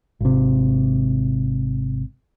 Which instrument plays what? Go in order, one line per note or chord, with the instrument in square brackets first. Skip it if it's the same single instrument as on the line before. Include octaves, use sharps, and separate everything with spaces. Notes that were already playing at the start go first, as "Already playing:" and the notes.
[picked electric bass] G#1 C3